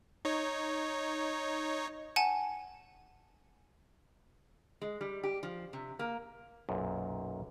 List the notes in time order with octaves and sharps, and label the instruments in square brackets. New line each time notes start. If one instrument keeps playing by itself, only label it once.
[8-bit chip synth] D#4 C#5
[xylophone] F#5 G#5 A5
[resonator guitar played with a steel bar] G#3
G3
G4
F3
C3
A#3
[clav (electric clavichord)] B1 F#2 A#2